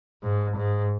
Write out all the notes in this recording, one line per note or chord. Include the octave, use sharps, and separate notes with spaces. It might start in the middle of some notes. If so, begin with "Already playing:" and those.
G#2
G#2